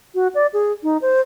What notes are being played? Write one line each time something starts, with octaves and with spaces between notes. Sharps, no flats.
F#4
D5
G#4
D#4
C5